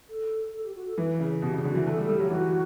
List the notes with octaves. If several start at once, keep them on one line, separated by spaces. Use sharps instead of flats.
A4
A4
G4
F#4
A4
E3 B4
C#3
B2 G4
C#3 G4
D3 F#4
E3
A3 A4
G3
A4
G3
F#3 G4
E3 F#4